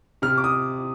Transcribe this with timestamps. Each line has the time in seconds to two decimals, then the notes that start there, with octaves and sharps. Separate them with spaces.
0.22 C3 F6
0.38 D6
0.44 D#6